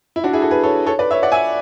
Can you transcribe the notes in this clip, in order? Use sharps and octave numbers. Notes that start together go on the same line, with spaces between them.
E4
D4 F#4
E4 G#4
F#4 A4
G#4 B4
A4 C#5
A4 C#5
B4 D5
C#5 E5
D5 F#5
E5 G#5